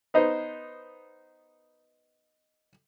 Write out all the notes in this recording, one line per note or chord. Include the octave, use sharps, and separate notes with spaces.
B3 D#4 C5